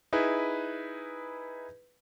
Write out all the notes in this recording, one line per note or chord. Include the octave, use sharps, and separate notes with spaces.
D#4 E4 G#4 B4